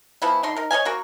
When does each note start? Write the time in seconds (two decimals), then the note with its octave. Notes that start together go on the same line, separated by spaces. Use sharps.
0.22 E3 F3 B3 E4
0.43 D3 D#4 C6
0.56 D#4 A#4
0.71 C#5 D#5 F5 G#5
0.85 A#3 F#4 A#4